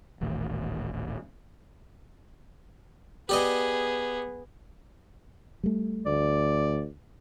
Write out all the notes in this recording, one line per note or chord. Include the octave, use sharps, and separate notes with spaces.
D#1 A1 D#3 A3
B3 G4 G#4 D5 D#5
G3 A3
D2 D5